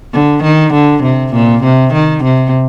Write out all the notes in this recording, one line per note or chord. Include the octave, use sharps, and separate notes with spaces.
D3
D#3
D3
C3
A#2
C3
D#3
C3